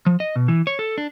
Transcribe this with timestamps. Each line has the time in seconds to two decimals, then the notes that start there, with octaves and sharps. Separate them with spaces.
0.06 F3
0.20 D#5
0.36 B2
0.48 E3
0.67 C#5
0.79 A4
0.98 D4